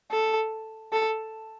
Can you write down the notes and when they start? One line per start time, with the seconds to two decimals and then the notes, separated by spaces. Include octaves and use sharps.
0.11 A4
0.92 A4